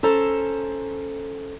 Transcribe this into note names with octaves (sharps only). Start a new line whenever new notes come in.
C#4 A4 C5 A#5